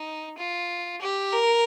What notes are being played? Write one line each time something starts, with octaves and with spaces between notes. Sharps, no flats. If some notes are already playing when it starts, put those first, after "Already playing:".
Already playing: D#4
F4
G4
A#4